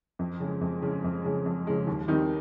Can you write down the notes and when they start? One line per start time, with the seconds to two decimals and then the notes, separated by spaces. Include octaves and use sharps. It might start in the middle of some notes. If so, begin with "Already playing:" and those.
0.19 F2
0.40 C#3 G#3
0.61 F2
0.82 C#3 G#3
1.04 F2
1.25 C#3 G#3
1.46 F2
1.67 C#3 G#3
1.87 D#2
2.08 D#3 G3 C4 D#4